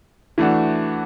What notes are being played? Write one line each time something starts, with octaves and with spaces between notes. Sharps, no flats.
E3 A3 D4 F#4